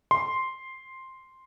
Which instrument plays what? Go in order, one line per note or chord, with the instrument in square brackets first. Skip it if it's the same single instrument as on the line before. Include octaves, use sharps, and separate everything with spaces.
[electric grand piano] C6